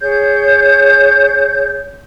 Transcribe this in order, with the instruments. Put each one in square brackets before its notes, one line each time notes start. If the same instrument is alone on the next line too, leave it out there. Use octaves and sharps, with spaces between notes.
[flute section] G#4 C#5 G6